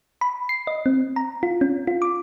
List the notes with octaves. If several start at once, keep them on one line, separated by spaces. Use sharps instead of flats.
B5
C7
D#5
C4
A#5
F4
C#4
F4
D6